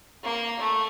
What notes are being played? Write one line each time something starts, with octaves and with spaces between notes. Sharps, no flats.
A#3
A3